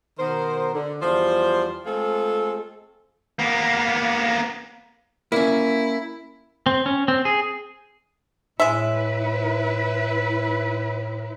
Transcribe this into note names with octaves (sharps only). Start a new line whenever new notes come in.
B2 D#3 B3 A#4 C5
D3
E2 F3 G3 C5
G#3 A3 C4 F4 G#4 A4
A#3 B3
A#3 C#4 E4
C4
C#4
C4
G#4
A2 G#3 E4 B4 E5